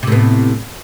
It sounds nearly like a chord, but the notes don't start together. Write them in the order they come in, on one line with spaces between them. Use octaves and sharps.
C3 A2 B3